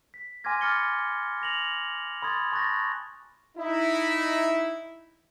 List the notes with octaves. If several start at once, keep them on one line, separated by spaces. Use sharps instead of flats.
B6
G#5 C6 D6 F6 G#6 A#6
B5 D6 F6 A6 C#7 G7
A#6 F7 F#7
B5 C6 D#6 G#6 A6
A5 C#6 F#6 G6 A6 A#6
D#4 E4